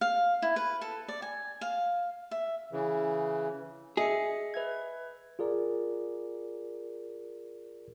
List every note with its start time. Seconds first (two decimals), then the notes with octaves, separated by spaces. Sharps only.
0.01 F5
0.42 E4
0.56 B4
0.81 A4
1.08 D5
1.22 G#5
1.61 F5
2.31 E5
2.72 C#3 E3
3.97 G#4 D#5 E5 C#7
4.54 B4 E5 G#6
5.39 F4 G#4 A#4 D5